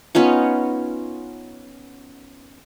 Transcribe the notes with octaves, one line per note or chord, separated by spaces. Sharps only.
B3 C#4 D#4 F4